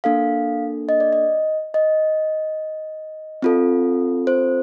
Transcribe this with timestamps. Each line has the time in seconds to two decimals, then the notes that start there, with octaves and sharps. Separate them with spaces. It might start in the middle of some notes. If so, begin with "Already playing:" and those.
0.04 A#3 D4 A4 F5
0.89 D#5
1.00 D5
1.13 D#5
1.74 D#5
3.42 C4 F4 A4
4.27 C5